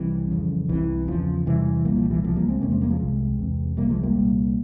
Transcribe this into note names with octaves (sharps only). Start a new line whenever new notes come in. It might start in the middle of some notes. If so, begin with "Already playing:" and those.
Already playing: C2 C3 E3 G3
F2 C#3
C2 C3 E3
E2 C#3 F3
E2 C3 E3 G3
C2 A#2 G3 A#3
F3
E3 G3
C#2 C3 F3 G#3
G3 A#3
G#3 C4
E2 C3 A#3 C#4
G#3 C4
G3 A#3
F3 G#3
C2 C3
E2 C3
C2 C3 G3 A#3
F3 G#3
G3 A#3
C2 A#2